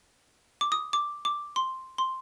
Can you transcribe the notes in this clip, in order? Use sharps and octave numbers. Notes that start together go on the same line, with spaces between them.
D6
D#6
D6
D6
C6
C6